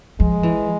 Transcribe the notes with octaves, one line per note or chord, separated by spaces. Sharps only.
F3 G#3
E3